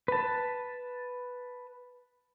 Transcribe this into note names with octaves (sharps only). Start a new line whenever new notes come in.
B4 A5